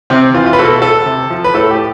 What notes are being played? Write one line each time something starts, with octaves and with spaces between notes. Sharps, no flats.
C3 C4
E3 F4
F4
B4
B2 A4
A4
C3
F3
B4
A2 A4
G4